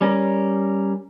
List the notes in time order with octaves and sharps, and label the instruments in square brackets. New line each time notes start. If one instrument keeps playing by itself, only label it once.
[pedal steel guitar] G3 C#4 A#4